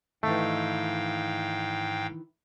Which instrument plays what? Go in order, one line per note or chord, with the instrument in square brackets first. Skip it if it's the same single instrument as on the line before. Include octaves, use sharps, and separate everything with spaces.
[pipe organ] G#2 F5 G5 [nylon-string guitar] D#3 E3 [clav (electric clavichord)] A3